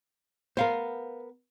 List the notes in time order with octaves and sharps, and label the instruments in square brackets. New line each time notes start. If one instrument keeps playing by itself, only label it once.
[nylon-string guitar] B3 A#4 [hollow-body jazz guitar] C5 F5